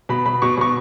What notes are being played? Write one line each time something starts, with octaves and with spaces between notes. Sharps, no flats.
B2 B5
B2 B5
B2 C#6
B2 C#6